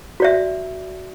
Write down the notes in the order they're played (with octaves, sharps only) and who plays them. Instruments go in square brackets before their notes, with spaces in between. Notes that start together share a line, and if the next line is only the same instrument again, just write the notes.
[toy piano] F#4 D5 E5